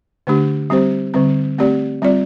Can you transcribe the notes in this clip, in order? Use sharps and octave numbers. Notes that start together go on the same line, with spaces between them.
D3 A3 D4 G4
G3 C4 G4 C5
D3 G3 C4
A3 C4 G4 D5
G3 C4 F4 D5